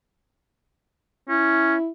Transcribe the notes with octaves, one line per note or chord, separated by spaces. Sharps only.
C#4 E4